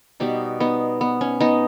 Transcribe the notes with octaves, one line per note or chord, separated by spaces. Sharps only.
B2 G3 B3 D#4 G4
B3 D#4
B3
C#4
B3 D#4